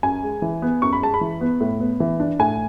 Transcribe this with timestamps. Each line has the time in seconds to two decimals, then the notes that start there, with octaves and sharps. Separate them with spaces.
0.03 F#2 G#5
0.23 G#3
0.42 E3
0.62 B3
0.82 F#2 C#6
0.93 B5
1.02 G#3 A5
1.14 B5
1.21 E3
1.41 B3
1.61 A2
1.80 B3
2.00 E3
2.20 D4
2.39 A2 G#5